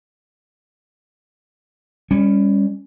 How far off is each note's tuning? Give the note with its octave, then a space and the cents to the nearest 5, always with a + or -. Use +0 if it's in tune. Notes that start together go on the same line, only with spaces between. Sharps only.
G3 +30 C#4 +0